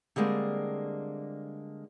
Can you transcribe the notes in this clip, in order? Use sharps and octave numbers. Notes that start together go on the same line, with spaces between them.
D3 G3 G#3 A#3 C4